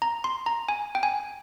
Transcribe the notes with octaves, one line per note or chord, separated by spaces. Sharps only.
A#5
C6
A#5
G#5
G5
G#5